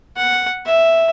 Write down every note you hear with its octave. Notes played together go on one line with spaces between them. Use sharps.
F#5
E5